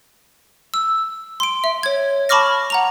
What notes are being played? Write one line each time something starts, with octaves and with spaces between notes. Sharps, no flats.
E6
C6 D7
E5
C#5 G#6
A5 B5 C#6 D6 F6 A#6
F#5 A#5 F7